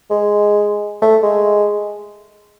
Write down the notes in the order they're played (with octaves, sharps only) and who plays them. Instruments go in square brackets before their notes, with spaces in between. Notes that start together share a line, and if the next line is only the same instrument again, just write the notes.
[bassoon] G#3
A3
G#3